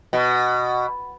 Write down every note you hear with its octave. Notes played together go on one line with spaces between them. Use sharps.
B2